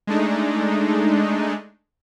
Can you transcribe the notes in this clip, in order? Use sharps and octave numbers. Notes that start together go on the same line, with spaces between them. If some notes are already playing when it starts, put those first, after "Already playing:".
G#3 A3 D4 D#4